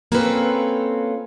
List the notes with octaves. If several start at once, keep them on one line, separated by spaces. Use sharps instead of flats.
A#3 C4 C#4 F4 A4 B4